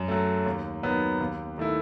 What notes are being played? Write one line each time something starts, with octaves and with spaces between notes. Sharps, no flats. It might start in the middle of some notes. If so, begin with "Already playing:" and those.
Already playing: F#2
F#3 A3
D#2
D#3 F#3 B3
D#2
D#3 A3 E4